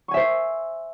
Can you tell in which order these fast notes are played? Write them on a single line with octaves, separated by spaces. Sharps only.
C#6 G#5 E5 C5